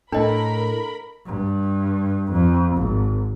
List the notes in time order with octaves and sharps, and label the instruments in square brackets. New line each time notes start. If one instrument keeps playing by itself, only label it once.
[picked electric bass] A2 [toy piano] D4 D#5 [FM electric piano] A4 [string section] A#4 B5
[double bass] G2
F2
G#1